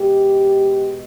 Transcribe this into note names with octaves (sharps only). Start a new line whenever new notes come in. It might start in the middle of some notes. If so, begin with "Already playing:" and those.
Already playing: B2 G#3 G4